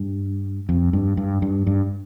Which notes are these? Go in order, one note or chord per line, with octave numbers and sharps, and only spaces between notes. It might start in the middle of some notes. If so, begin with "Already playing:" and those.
Already playing: G2
F2
G2
G2
G2
G2